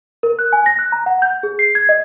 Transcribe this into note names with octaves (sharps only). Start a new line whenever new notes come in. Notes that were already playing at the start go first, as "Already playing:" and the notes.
A#4
F#6
G#5
A#6
F#6
A#5
F#5
G6
G#4
C7
G#6
D#5